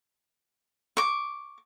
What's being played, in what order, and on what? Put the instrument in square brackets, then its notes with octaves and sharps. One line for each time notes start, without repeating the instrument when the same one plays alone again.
[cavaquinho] C#6 D6